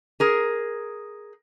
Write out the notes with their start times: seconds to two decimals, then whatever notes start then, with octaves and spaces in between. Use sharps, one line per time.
0.20 G#4 A#4